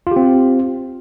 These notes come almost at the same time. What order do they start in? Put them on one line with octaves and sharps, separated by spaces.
F4 G4 C4